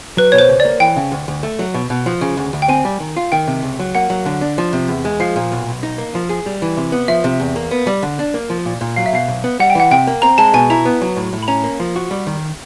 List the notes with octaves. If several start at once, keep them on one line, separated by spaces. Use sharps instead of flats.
F#3 B4
B2 C#5
C5
C#2
D5
A#3
E3 G5
C#3
D2
D2
A3
F#3
B2
B2
F3
C#3
D2
D2
G5
C4 G#5
G3
D#3
F4
D#3 G5
C3
C#2
F#3
A#3 F#5
F#3
D3
D4
F3
C3
E2
G#3
F3 F5
A#2
B1
B1
D#4
A#3
F3
G#4
G3
E3
C3
B3
F3 E5
C3
E2
A#3
B3
G3
D3
D4
A#3
F3
A#2
A#2
F#3 F5
E5
B2 F5
B1
B3
G3 F#5
G5
E3 F#5
C3 G5
A#3
C4 A#5
G#3 A5
B2 G#5
E4 A#5
B3
F#3
A2
A2
B5
C#4 A#5
A#3
F3
F#4
G3
D#3